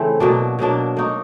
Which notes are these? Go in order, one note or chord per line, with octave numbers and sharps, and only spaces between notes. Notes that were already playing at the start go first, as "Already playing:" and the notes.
Already playing: C#3 E3 A3 C4
B2 F#3 A#3 D4
B2 F#3 A#3 D4
A#3 D#4 F#4